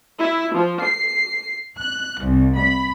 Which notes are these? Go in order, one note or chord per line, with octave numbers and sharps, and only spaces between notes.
E4
F3
C7
F#6
C2
B5